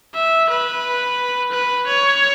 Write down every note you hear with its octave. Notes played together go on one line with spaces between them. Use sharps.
E5
B4
B4
C#5